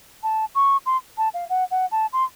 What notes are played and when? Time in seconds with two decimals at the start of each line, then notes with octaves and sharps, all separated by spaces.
0.23 A5
0.55 C#6
0.86 C6
1.18 A5
1.34 F5
1.49 F#5
1.71 F#5
1.91 A5
2.13 C6